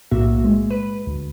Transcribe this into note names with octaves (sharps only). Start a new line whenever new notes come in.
B1 A2 A#3 F#4 E5
G#3
B4
D2